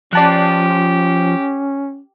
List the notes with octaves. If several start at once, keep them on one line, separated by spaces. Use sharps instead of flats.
F3 C#4 G4 D5 A5 F#6